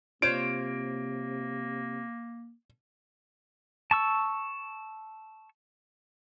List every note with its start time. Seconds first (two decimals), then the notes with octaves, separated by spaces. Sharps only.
0.22 C3 A#3 F4 C5 C#5 D7
3.91 A5 C#6 E6